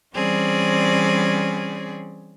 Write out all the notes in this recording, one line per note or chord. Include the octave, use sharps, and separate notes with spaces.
E3 G3 C4 C#4 G#4 D5